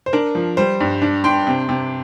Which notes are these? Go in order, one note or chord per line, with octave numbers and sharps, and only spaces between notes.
C5
D4 A#4
F3
G3 C5
G2
D4
D4 G5 C6
C3
C3